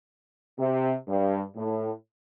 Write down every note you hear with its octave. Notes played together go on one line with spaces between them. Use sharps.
C3
G2
A2